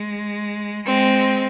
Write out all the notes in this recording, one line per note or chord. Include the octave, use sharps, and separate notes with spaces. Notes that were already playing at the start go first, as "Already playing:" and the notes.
Already playing: G#3
G#3 C4